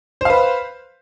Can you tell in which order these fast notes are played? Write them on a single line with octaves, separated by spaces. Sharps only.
C5 F5 B4